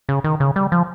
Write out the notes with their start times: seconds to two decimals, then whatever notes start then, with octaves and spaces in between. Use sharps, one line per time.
0.09 C#3
0.24 D#3
0.40 C#3
0.56 G3
0.72 F3